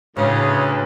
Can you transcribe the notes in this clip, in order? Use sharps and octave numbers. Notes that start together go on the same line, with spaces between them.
D2 A2 C#3 G#4 B4